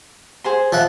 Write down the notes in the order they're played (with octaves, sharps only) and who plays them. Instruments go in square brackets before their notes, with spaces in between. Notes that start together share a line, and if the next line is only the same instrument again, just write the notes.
[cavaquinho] G#4 C5 C6
[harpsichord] F3 E5 F#5